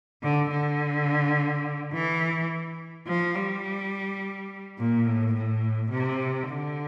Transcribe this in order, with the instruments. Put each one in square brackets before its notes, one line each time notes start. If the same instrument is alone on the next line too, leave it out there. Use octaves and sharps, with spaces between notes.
[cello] D3
D3
E3
F3
G3
A#2
A2
A2
C3
D3